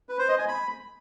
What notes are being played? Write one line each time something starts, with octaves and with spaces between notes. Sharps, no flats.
B4
C5
D#5
G#5
B5